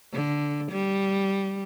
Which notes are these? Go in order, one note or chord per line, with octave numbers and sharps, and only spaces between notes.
D3
G3